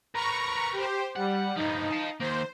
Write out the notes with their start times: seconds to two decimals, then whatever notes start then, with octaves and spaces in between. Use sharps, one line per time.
0.15 A#4 B4 A#5 C#6
0.73 G4 C5
1.16 G3 F#5
1.56 G2 F3 D#4
1.90 F5 A5
2.20 D#3 A#3 C5